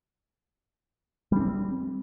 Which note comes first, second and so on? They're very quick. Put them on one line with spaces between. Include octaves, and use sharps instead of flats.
G3 D4 C4